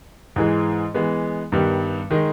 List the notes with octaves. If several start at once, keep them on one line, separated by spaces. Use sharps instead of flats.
G#2 E3 G#3
E3 G#3 B3
G2 D#3 G3 B3
D#3 G#3 D#4